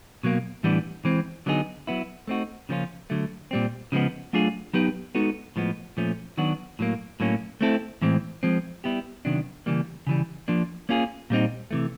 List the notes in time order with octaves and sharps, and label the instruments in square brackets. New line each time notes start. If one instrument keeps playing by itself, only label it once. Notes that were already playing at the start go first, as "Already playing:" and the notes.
[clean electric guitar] B2 F#3 A#3
A2 E3 G3 B3 D4
E3 G#3 C4
D3 F#3 B3 D#4 G#4
F#3 B3 E4
A3 C4 D#4 F#4
C#3 F3 A#3 C#4 F4
D3 F#3 A3
A#2 G3 C4
C#3 F3 G#3 B3
F#3 A3 D4 F4 G#4
F#3 B3 D#4 G4 B4
G#3 B3 D#4 F#4 A4
A2 F3 G#3 B3
A#2 F3 A3 C#4
D#3 F#3 B3 D4 F#4
A2 F#3 A#3
A2 F#3 A#3 C#4
A3 C4 E4 A4
A2 E3 G#3 C4
F3 G#3 C4
G3 B3 E4 G4
C3 D#3 F#3 B3 D4
C#3 E3 G3 A#3
C#3 E3 G3
F3 A#3 D4
A#3 C#4 F4 G#4
A#2 G3 C4 D#4
C3 E3 A3